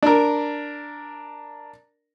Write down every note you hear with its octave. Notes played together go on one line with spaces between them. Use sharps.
D4 A#4